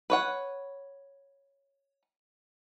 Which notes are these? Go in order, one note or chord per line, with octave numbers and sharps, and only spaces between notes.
B4 C#5 F#5